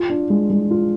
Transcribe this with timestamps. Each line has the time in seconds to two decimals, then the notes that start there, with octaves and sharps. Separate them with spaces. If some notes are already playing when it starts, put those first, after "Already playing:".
Already playing: F4
0.10 D4
0.30 G#3
0.50 G#3
0.71 F4